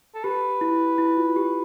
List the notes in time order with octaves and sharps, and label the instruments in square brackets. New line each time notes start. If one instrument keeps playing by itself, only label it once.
[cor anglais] A4
[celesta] G4 [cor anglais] B4
[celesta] E4
E4
F4
G4